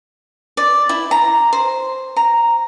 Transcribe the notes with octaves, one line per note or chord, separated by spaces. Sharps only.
D5
E4
A#5
C5
A#5